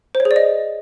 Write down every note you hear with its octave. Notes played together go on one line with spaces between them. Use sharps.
C5
C#5
G#4
D5
D#5